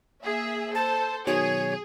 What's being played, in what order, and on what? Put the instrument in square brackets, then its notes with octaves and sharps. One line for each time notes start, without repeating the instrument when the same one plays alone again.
[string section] A#3 G#4 E5
[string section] A4 C5 [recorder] A5
[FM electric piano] B2 D#3 F#3 [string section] G#4 [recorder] C#5